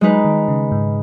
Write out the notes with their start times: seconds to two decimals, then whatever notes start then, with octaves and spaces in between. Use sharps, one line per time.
0.01 F#3 G#3 D#4 B4
0.25 D#3
0.48 C#3
0.72 G#2